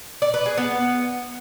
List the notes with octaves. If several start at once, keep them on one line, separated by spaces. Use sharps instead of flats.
D5
B4
G#4
B3